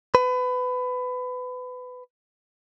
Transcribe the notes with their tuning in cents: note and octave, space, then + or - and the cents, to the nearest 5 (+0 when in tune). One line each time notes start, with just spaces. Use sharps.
B4 +25